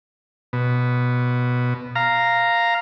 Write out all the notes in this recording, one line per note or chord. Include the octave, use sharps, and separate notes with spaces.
B2
F5 A#5